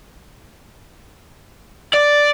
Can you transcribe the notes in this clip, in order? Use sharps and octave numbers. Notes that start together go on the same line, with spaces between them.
D5